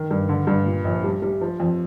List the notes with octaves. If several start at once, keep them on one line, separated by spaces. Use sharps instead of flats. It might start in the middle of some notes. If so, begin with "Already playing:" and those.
Already playing: D#3
G2
D3
G2
A#2
A#1
G3
G3
F3
F2